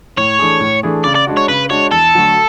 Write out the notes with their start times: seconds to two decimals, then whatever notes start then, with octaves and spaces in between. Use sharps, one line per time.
0.17 A2 C#5
0.39 E3 A3 D4 G#4
0.60 A2
0.83 E3 A3 D4 G#4
1.04 C#3 D5
1.16 D5
1.27 G#3 D4 F#4
1.37 C#5
1.48 C#3 B4
1.70 G#3 D4 F#4 C#5
1.92 E2 A4
2.15 D3 F#3 A3